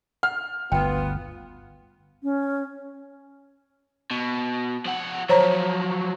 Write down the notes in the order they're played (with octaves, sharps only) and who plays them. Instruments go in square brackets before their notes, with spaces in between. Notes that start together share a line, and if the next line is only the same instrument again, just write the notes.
[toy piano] F#5 [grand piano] F6
[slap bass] G1 D2 [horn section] B3 F4 [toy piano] F#5 G5
[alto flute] C#4
[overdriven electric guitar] B2
F3 F#5
[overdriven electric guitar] F3 F#3 [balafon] C5 C#5 A#5